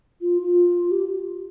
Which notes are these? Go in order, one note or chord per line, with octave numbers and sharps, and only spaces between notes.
F4
F4
G4